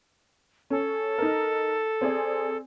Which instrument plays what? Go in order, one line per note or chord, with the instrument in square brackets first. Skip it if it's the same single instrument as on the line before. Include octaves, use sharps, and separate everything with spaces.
[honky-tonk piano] C#4 [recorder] A4
[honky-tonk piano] D#4 A#4
C4 G#4 D5